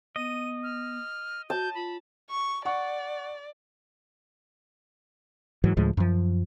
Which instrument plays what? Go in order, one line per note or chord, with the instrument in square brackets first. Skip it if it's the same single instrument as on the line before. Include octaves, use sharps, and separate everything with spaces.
[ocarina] B3 [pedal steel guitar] D#5 [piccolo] D#7
[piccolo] F6
[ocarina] F#4 [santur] A5 [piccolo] G6
[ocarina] F4 [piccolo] B5
[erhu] C#6
[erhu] D5 [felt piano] F#5 C#6
[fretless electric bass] G#2 E3 F#3
D2 A2 F3 G#3
F#2 F3